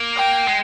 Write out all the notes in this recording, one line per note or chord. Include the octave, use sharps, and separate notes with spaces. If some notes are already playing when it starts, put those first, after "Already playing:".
Already playing: A#3
G5
G#3